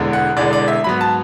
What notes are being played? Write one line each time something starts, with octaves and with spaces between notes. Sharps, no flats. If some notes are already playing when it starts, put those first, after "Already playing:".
Already playing: E1 E2 D3 G#3
F#5
E1 E2 D3 G#3 D5
D5
E5
G#2 F#3 B3 B5
A5